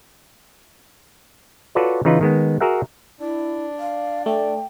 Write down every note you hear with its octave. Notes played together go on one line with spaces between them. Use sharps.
F4 F#4 A4 B4 C#5 D5
C#3 E3 D#4 F4 B4
D#3 G#3 B3
F#4 G#4 A#4 E5 F#5
D4 E4
D5 F5
A3 G5